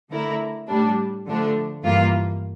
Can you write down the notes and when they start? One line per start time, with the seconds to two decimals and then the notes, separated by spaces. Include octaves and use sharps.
0.10 D3 A3 E4 A#4
0.68 A2 G3 D4
1.26 D3 F3 A3 D4
1.83 G2 E3 A#3 F4